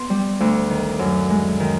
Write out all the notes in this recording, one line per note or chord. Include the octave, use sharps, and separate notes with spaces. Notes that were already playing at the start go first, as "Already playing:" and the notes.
Already playing: B3 C6
G3
D2
D#3
F#2
G#3
D#3